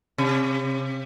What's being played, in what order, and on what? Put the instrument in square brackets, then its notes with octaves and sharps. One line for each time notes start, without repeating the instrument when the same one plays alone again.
[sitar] C3